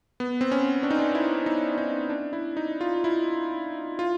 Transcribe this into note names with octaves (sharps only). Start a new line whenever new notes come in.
B3
C4
C#4
D4
D#4
D4
E4
D#4
D#4
D4
E4
D#4
F4
E4
F4